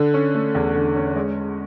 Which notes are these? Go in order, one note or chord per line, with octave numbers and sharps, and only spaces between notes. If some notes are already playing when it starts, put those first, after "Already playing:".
Already playing: D3
C#4
A3
E2
D3
C#4
G#3